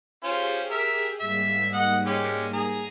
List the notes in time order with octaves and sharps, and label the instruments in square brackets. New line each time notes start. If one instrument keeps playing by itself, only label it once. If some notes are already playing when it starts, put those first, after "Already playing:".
[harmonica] C#4 F4 C5 [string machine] G4 G#4
[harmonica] A#4 E5
[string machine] G#2 G3 A#3 [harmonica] E5
[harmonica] D#5 F#5
G#3 C#4 G4
G#4 A#5